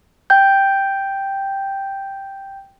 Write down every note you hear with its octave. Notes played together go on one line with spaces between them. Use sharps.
G5 G6